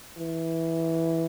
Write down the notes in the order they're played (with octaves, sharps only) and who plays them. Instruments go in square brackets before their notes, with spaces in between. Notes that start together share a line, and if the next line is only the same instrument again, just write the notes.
[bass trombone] E3